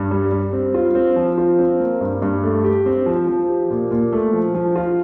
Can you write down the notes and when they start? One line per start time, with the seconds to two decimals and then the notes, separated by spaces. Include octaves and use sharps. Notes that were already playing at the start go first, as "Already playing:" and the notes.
Already playing: G2
0.11 G3
0.32 G3
0.53 C4
0.74 F4
0.95 C4
1.16 F3
1.38 F4
1.59 C4
1.79 A#3
2.01 G2
2.22 G2
2.43 A3
2.64 G4
2.86 C4
3.06 F3
3.27 F3
3.49 G4
3.70 A#2
3.91 A#2
4.13 A3
4.33 F3
4.55 F3
4.76 F4